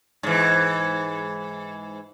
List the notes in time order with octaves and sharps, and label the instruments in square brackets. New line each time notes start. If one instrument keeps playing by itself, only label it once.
[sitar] G#2 E3